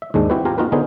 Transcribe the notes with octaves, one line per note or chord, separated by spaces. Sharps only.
E5
D#2 G#2 G#3 D4
C4 E4 F#4 G4 B4
F4 G4 F5 G#5 A#5
A#3 D#4 F4 F#4 A#4 B4
D3 B3 D#4 G#4 C5